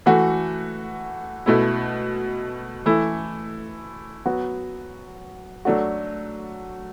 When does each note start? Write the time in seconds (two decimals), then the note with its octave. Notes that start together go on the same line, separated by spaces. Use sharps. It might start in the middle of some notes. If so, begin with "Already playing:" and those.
0.06 E3 A3 F#4
1.46 B2 A3 E4
2.86 E3 A3 E4
4.26 F#3 B3 F#4
5.65 F#3 A3 D4 F#4